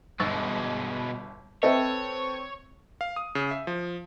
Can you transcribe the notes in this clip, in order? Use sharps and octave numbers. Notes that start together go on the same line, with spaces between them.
G1 B2 G#3 C#6 E6 A6
C4 A4 B4 C#5 D#5 E5 G5
F5
D#6
C#3
E5
F3